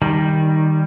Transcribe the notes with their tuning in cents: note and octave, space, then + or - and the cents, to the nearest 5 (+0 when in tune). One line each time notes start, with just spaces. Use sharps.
D#3 +0 G3 +0